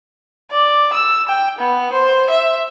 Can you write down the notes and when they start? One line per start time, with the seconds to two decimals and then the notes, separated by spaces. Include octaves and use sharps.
0.51 D5
0.93 E6
1.28 G5
1.58 B3
1.92 C5
2.30 E5